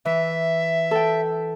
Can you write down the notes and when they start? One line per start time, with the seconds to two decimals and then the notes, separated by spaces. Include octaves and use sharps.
0.05 E3 E5
0.91 A4 G5